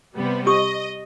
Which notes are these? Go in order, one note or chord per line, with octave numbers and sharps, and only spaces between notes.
C3 G3 B3
G4 D#5 D#6